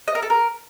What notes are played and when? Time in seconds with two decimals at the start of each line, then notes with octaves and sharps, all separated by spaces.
0.08 D#5
0.15 A#4
0.22 A4
0.30 A#4